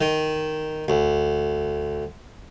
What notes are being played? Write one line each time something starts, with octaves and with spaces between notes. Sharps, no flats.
D#3
D2